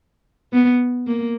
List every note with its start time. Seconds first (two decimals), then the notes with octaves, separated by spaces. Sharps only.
0.53 B3
1.07 A#3